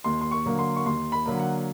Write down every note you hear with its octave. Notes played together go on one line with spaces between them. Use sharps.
D#2 C6
C6
C#6
D3 F#3 A#3
C6
C#6
D#2 C6
B5
D3 F#3 A#3
F#5